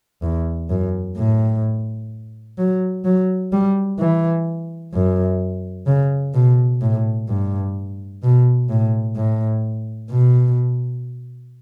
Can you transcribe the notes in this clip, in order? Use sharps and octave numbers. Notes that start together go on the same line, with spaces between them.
E2
F#2
A2
F#3
F#3
G3
E3
F#2
C#3
B2
A2
G2
B2
A2
A2
B2